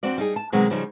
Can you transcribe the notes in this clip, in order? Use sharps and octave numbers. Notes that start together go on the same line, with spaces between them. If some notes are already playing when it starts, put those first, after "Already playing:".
F2 C4 D4 F#4 D5
G3 D#4 G#4
A5
B2 D#3 F#3 G#3 C4
C#3 F3 G3 C#4 D#4